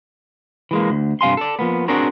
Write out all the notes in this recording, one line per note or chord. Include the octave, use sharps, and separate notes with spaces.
E3 G#3 A#3
D2
G2 C3 F5 G#5 C6
A4 D5
F3 A#3 B3
C4 D4 F#4 G#4 A#4 C#5